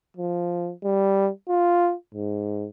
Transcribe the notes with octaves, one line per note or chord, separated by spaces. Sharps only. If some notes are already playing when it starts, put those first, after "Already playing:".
F3
G3
F4
G#2